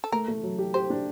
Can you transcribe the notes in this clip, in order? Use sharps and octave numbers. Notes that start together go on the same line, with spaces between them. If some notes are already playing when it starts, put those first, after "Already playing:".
A4
A3 A#4
A3
F#3
G4
G4 C5
D4